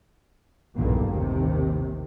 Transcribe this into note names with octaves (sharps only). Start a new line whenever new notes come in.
B1 E2 G2 A#2 D3 A#3
A1 D#2 C3 D#3